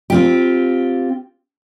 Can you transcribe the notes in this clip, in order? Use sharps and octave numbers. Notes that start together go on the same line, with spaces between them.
C4 F4 G4